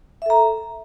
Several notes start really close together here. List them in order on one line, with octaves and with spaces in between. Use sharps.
E5 A4 A#5